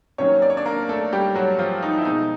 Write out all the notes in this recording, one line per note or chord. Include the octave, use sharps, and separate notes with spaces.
C3 D#3 F#3 A#3 C#4 C#5
D5
C#5
D4 D5
A#3 A#4
A3 A4
G3 G4
F#3 F#4
F3 F4
D#4
E4
B2 G#3 C4 D#4